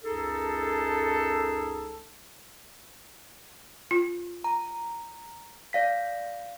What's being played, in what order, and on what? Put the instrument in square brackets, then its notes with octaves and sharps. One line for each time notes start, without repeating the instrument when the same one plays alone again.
[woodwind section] C#2 F#2 D#4 G#4 A4
[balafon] F4
[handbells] A#5
D5 F5 B6